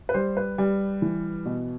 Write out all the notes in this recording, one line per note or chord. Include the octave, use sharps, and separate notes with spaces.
B4
G3 C5
B4
G3
E3
B2